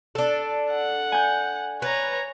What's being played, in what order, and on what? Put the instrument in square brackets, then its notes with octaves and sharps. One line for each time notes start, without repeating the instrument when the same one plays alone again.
[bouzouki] D4 A4
[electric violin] F#5
[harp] G#5 G6
[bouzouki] B4 [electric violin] C#5 A#5